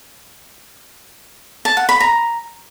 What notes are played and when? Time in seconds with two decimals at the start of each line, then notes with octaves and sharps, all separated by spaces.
1.65 A5
1.77 F#5
1.89 B5
2.00 A#5